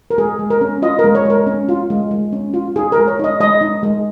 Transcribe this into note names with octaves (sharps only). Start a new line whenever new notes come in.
A#4
G#3 G#4
G#3
A#4
C#4
F4 D#5
A#4
G#3
C#5
G#3 A#4
C#4
F4
G#3
G#3
C#4
F4
D#4 G#4
A#4
G#3
C#5
D#4 D#5
G#3 D#5
D#4
G#3